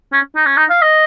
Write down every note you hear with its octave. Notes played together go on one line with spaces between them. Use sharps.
C#4
D#4
C#4
D#4
F5
D#5